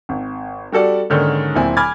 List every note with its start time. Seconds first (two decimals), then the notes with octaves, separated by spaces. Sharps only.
0.09 G#1
0.72 G3 F#4 A4 D5
1.10 G#2 D3 D#3 A#3 C#4
1.55 D1 A#2 C4 E4 G#5
1.77 G#5 B5 D6 F6 G#6 A6